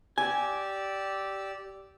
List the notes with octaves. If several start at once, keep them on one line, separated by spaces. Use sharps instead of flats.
G4 D5 G#5 E6